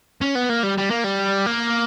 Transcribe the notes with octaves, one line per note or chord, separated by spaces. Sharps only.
C#4
B3
A#3
G3
G3
A#3
G3
A#3